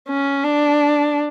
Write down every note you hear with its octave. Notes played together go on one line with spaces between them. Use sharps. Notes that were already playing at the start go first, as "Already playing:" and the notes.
C#4
D4